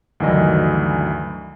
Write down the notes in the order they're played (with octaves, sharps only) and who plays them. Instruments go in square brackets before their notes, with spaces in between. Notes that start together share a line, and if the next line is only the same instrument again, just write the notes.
[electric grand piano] D2 G2 D#3 E3 F#3 D#5